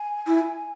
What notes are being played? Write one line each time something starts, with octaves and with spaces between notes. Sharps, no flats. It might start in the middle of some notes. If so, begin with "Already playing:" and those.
Already playing: G#5
E4